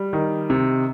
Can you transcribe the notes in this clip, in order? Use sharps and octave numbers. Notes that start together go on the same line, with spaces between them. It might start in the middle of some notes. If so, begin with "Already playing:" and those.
Already playing: G3
D#3
C3